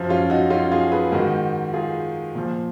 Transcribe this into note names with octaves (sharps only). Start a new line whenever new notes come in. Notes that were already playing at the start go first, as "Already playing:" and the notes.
Already playing: F#2 F3
C#4 F4
D#4 F#4
C#4 F4
F4 G#4
G#4 B4
G#2 D#3 F#4 A#4
F4 G#4
A#2 F3